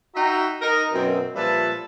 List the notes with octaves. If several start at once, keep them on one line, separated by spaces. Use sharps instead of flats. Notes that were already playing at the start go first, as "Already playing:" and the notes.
D#4 F#4 E5 G5 A#5
D#4 A#4 D#5
F#2 B2 C4
A#2 F3 G3 B4 E5 A5